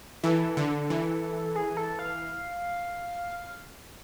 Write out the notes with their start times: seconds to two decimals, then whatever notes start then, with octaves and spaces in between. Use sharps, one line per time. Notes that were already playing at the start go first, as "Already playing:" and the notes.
0.24 E3 A4
0.57 D3
0.90 E3
1.55 G#4
1.77 A4
1.99 F5